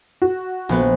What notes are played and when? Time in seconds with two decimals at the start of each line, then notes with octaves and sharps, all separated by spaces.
0.22 F#4
0.69 A#1 B3